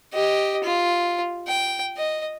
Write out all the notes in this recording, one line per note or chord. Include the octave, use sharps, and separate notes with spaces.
G4 D#5
F4
G5
D#5